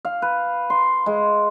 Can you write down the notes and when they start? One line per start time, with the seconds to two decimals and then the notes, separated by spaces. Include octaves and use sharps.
0.05 F5
0.22 B4
0.70 C6
1.06 G#3